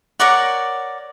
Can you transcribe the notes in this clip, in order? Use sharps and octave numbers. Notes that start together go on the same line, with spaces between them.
A#4 C#5 D5 F#5